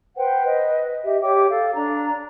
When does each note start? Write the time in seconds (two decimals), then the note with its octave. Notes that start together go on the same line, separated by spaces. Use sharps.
0.16 B4 C5 F#5 G5
0.45 B4 D#5
1.05 G4 D#5 E5
1.22 G4 C#5 G5 D6
1.49 A4 F5
1.75 D4 A#5